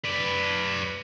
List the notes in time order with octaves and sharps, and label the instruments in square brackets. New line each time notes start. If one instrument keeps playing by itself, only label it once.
[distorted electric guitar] B4 D5